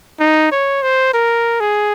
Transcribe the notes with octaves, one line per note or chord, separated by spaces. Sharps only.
D#4
C#5
C5
A#4
G#4